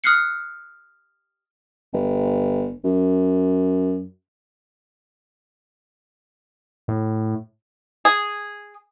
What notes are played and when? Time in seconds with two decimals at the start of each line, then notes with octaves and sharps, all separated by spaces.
0.04 D#6 F6 F#6 C7 C#7
1.93 G1
2.84 F#2
6.88 A2
8.05 G#4